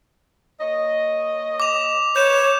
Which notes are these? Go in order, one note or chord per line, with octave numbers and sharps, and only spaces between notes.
A#3 C#5 D#5
D6 F7
B4 C#5 G6 E7